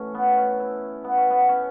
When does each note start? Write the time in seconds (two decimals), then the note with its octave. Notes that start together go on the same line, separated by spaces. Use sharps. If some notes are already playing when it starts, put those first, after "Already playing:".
Already playing: A2 E3 A3 C#4
0.14 B3
0.37 C#4
0.60 E4
1.04 B3
1.18 C#4
1.30 B3
1.49 C#4